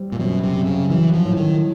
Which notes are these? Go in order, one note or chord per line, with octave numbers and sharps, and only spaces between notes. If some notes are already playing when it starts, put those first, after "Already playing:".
Already playing: G3 C4
A#2
F#2 B2
C3
G3
C#3
E3 F#3
F3
A2
D#3